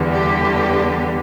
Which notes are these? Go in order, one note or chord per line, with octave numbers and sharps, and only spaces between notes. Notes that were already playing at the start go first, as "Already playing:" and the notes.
Already playing: E2 D3 G3
G4